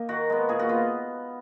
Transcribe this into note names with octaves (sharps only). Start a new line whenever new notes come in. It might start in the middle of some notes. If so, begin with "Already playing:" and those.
Already playing: A#3 D#4
D#3 F#4
G#3 B3
A#2 G#4
F#4
B3 F4